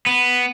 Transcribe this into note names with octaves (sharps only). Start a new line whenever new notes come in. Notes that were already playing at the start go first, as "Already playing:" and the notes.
B3